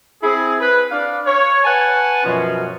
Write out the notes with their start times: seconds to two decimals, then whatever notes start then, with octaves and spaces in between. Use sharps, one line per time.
0.23 C4 E4 G#4
0.61 B4
0.91 D4 F5
1.26 C#5
1.64 B4 F#5 G#5 A5
2.24 F#2 B2 F3 C#4